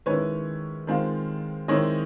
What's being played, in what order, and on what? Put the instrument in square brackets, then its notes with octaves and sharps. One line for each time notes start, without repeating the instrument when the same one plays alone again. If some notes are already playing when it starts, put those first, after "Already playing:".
[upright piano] D#3 G#3 C#4 E4 B4 C#5
D#3 G#3 C4 F4
D#3 G#3 C4 E4 C#5 D#5